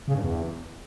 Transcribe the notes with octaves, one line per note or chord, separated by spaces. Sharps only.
C#3
G2
E2